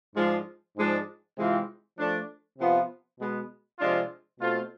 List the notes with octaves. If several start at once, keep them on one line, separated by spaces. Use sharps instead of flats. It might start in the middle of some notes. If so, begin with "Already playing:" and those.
G#2 F3 G#3 D4 F4
G#2 F3 G#3 D4
C3 E3 G#3 C4 F4
F3 A3 D4
C3 F3 B3 F4
B2 G#3 B3
C3 F3 G#3 D4 F4
B2 A3 C4 F4